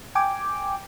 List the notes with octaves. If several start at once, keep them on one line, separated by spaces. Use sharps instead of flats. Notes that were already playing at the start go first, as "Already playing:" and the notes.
G5 G#5 D6